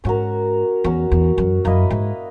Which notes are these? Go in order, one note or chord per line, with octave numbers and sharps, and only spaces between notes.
G#2 C#4 F#4 A#4
E2 C#4 F#4 A#4
E2
F#2
F#2 A#3 E4 B4 D#5
G#2